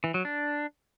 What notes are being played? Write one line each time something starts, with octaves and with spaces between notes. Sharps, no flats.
E3
F#3
D4